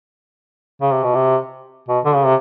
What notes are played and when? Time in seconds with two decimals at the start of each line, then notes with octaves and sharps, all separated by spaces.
0.81 C#3
0.92 C3
1.04 B2
1.15 C3
1.89 B2
2.05 D3
2.15 C#3
2.25 C3